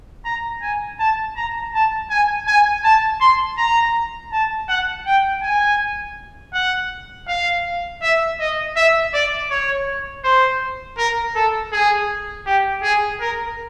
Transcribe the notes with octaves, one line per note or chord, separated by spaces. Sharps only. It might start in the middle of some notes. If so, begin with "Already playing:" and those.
A#5
G#5
A5
A#5
A5
G#5
G#5
A5
C6
A#5
A5
F#5
G5
G#5
F#5
F5
E5
D#5
E5
D5
C#5
C5
A#4
A4
G#4
G4
G#4
A#4